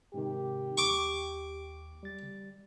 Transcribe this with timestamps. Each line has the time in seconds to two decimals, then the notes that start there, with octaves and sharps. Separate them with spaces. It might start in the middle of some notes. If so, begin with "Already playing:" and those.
0.14 G#2 C3 D#3 G4
0.78 D#2 C#6 D6
2.03 G3 A6